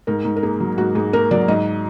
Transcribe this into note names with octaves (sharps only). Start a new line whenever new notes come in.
G#2 A#4
G#2
A#4
A#3 G#4
F#3
G#2 F#4
G#2 G#4
A#3 A#4
F#3 D5
G#2 D#5